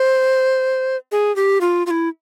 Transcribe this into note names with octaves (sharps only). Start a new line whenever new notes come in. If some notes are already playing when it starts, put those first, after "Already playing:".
Already playing: C5
G#4
G4
F4
F4
E4